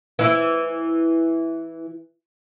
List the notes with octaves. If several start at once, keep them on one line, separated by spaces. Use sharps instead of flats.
E3 E4